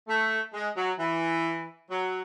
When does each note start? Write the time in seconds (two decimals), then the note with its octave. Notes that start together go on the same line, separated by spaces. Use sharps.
0.08 A3
0.54 G#3
0.76 F#3
0.98 E3
1.90 F#3